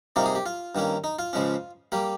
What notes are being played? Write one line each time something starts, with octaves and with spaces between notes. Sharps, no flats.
C3 G3 A#3 D#4 F4
G#4
G4
F4
G2 D#3 A#3 C#4
D#4
F4
C#2 C#3 F3 G#3 C#4
G3 A#3 G4